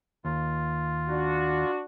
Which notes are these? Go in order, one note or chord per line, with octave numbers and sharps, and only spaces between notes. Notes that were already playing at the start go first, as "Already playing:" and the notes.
D#2 F4
D4 F#4